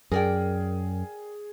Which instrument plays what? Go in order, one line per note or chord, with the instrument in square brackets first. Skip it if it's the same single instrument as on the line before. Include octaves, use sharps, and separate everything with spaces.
[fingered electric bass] F#2 [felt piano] G#4 [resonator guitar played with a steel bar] A#4 D5 G5